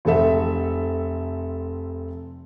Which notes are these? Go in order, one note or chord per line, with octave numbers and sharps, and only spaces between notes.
F1 C4 A4 E5